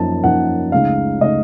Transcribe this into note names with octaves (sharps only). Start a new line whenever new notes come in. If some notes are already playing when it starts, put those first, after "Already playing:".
Already playing: F#2 F3 A#3 D#4 A5
F#2 F3 A#3 D#4 F#5
C#2 C#3 A3 D#4 F5
C#3 A3 D#4 D#5